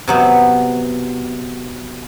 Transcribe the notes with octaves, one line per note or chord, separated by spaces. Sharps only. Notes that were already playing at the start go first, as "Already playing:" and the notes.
C3 F#3 B3